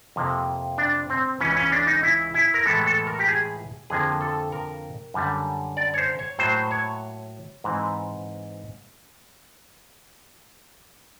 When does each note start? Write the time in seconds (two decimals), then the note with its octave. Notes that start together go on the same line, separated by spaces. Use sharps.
0.16 F2 C3 F3 A#3
0.78 D4
1.10 C4
1.40 C#2 C#3 E3 C#4
1.56 C#4
1.72 D4
1.87 D#4
2.03 E4
2.34 E4
2.54 A#4
2.66 A2 E3 G#3 B3 A4
2.86 A4
3.07 A#4
3.19 G4
3.28 G#4
3.90 F2 D3 F3 A#3 G#4
4.21 A4
4.52 A#4
5.14 F#2 D3 G3
5.77 D5
5.94 C#5
5.98 C5
6.19 C#5
6.39 A2 F#3 A#3 C5
6.71 C#5
7.64 G#2 E3 G#3 C4